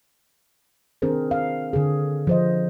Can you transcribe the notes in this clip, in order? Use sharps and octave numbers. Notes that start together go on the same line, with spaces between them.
D#3 C4 D4 G#4 A#4 C5
F5
D3 G#4
F3 C5 D#5